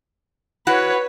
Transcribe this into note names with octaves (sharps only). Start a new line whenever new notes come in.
E4 F#4 B4 C#5 F#5